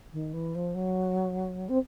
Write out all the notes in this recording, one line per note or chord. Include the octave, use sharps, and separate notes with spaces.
D#3
E3
F3
F#3
C4